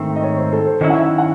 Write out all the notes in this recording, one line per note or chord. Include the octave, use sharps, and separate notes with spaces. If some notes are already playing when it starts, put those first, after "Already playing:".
Already playing: G#2 D#3 A3 C4
D#5
C#5
C5
A4
C5
D#3 F#3 C#4 E4 D#5
F#5
E5
F#5